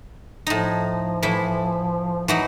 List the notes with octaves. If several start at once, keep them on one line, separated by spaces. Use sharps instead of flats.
A2 F3 D#4
A2 E3 E4
E3 F#3 D#4